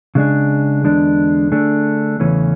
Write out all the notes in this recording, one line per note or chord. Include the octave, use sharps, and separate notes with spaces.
C#3 G#3 D4 G#4
E2 D3 G#3 D4
D3 A3 D4 G#4
E2 C#3 E3 A3 C#4